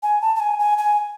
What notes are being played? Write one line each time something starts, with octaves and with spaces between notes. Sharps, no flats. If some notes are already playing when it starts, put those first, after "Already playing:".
G#5
A5
A5
G#5
G#5
G#5